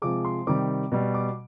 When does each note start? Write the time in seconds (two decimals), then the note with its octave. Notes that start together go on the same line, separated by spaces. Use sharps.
0.02 C3 F3 G#3 D6
0.25 C6
0.47 C3 D#3 G3 D6
0.92 B2 G3
1.14 D6